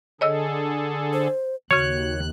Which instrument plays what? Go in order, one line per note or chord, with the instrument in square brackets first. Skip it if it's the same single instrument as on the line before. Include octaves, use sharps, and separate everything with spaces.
[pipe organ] D3 G#4 A4 [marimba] C#5 D#5 E6
[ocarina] C5
[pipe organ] D#2 F#6 [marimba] C#3 C#6 [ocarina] F#4 [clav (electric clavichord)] C#5